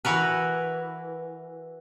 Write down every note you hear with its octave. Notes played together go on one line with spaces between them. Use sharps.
E3 F#4 A#4 B4